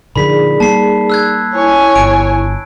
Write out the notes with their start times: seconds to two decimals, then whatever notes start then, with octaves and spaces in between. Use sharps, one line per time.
0.16 A#2 D3 F3 D#4 G#4 D5 B5 B6
0.60 G3 A#3 A5 C7
1.10 E6 F#6 G#6
1.54 E4 C#5 G#5
1.96 G1 D7